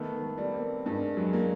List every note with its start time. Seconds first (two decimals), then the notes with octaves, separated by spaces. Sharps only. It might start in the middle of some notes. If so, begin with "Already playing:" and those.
Already playing: D#3 A3 B3
0.22 A3 B3
0.38 G3
0.54 A#3 C4
0.86 G2 G#3 A#3
1.17 F#3 G#3
1.33 A#3